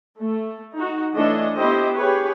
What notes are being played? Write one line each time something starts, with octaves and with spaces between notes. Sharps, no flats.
A3
D#4 F#4
E3 A3 D4 A4 C#5 D#5
B3 E4 G4 C5 D#5
G4 G#4 B4 C#5